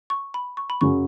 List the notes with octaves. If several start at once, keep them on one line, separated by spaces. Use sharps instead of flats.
C#6
B5
C#6
B5
F#2 C#3 F#3 C#6